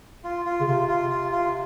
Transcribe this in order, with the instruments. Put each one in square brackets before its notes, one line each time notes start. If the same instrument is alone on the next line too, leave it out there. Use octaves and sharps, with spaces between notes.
[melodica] F4
F4
[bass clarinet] C#3
[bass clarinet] C3 [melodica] F4
[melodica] F4
F4
F4